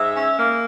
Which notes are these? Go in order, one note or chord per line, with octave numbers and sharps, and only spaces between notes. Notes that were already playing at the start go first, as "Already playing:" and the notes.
Already playing: G#2 E5
C#4
A#3